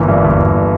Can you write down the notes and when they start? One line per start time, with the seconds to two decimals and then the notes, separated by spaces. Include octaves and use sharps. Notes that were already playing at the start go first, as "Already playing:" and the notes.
Already playing: G1 E3 A#3
0.09 G2
0.24 G1
0.39 G1